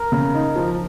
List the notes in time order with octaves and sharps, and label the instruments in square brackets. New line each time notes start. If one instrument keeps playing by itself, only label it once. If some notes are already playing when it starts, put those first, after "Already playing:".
Already playing: [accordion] A#4
[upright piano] C#3
D#4
F3